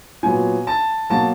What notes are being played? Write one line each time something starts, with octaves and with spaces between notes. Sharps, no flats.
A#2 F#3 B3 G#5
A5
B2 F#3 A#3 A5